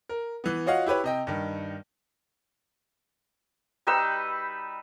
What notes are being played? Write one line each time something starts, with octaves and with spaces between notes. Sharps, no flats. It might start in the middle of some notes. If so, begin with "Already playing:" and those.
A#4
E3 B3
F4 F#4 C#5 D#5 F5 F#5
E4 G4 B4 C#5
C3 D#5 G5
G2 D#3
G3 D#4 B4 E6